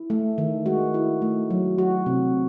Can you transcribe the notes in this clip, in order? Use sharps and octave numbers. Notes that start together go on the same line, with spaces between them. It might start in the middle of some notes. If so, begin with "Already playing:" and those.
Already playing: E4
A3
D#3
G#3 F#4
E4
A3
F#3
F#3 F#4
C3